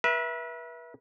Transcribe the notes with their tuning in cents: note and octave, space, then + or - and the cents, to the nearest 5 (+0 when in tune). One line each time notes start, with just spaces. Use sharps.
B4 -35 E5 +0